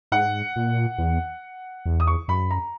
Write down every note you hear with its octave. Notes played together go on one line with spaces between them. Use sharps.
G#2 F#5
A#2
E2
E2
D#6
C#6
F#2 B5
A#5